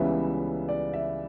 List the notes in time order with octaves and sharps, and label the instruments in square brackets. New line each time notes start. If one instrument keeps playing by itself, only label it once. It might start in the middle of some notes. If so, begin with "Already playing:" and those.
Already playing: [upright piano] C#2 C#3 E3 G3 B3 E5
D5
E5